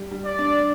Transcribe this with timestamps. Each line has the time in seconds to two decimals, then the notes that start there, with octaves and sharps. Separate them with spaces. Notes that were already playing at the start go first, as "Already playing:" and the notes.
Already playing: G3
0.11 G3
0.25 D5
0.39 D4